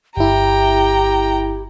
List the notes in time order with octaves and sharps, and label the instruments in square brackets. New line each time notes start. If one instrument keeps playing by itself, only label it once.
[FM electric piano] G1 E4 [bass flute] G4 [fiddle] G5 A#5